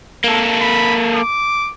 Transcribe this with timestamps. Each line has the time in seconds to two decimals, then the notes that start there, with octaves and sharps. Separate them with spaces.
0.24 A#3 A4
0.61 B5
1.15 D6